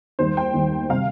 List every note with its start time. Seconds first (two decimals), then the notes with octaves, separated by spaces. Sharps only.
0.19 D#2 D#3 G3 C5
0.37 G5
0.54 D#2 D#3 G3
0.90 C3 G3 F5